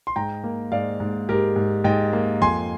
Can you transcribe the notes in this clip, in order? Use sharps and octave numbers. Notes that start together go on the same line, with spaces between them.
C6
G#2 G5 A#5
A#3
G#2 D5 F5
G#2
G#2 G4 A#4
G#2
G#2 D#5 G5
A#3
F2 G#5 C6